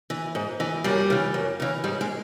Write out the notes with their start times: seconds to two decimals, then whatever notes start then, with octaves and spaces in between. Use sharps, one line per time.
0.10 E3
0.35 G#2
0.60 E3
0.84 F#2 G3
1.10 C#3 E3
1.34 F#2
1.60 C#3 E3
1.84 G#2 G3
2.01 G#3